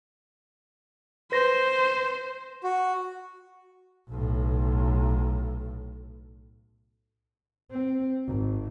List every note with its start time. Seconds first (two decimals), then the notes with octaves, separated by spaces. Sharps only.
1.32 B4 C5 A#6
2.63 F#4
4.09 B1 A2
7.71 C4
8.26 G#1